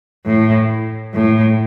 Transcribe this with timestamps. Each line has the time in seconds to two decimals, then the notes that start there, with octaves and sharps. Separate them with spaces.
0.26 A2
1.14 A2